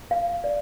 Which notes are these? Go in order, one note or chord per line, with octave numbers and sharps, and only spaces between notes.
F5
D5